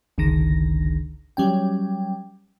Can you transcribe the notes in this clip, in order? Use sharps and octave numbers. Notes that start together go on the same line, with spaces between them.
G1 C#2 D3 D#3 A#6
F#3 G3 C#4 G5